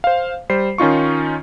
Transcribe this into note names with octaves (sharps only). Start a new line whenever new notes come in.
C5 F5
G3 C5 C7
D#3 C#4 D#4 F4 C#6